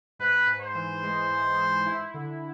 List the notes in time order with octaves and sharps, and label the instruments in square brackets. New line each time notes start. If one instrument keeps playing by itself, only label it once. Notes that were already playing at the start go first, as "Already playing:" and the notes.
[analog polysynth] G#2 [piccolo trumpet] B4
[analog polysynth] G#2
[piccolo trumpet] C5
[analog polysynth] E3
G#3
G#2
E3
E4
D3